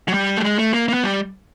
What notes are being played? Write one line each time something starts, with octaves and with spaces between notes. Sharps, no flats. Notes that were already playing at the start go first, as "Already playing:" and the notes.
F#3
G3
A3
G#3
A3
A#3
A#3
B3
G3